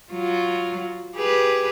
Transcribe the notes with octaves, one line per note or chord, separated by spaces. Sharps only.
F#3 F4
G4 G#4 B4